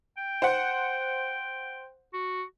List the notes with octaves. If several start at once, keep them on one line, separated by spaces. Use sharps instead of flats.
G5
C5 F#5
F#4